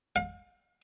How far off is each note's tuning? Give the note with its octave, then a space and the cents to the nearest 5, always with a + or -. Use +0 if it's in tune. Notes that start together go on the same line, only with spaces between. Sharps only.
F5 +40